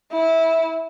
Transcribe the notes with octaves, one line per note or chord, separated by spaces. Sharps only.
E4